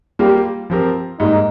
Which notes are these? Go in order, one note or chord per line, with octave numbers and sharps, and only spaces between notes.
G3 A#3 F4 G4 A#4
F3 C4 G4 A#4
G#2 G3 A#3 D#4